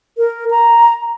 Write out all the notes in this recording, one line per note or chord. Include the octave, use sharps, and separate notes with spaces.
A#4
A#5